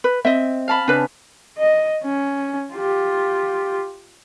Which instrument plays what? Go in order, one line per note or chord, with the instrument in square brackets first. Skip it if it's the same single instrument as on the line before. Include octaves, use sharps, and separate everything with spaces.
[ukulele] B4
[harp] C4 [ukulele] D#5 E5
[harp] F5 A5 B5
[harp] C#3 [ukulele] D4 B4
[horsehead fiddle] D#5
C#4
F4 G4